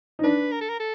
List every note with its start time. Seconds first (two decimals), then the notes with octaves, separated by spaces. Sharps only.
0.19 D#4
0.24 D4 B4
0.52 A#4
0.61 A4
0.69 A#4
0.80 A4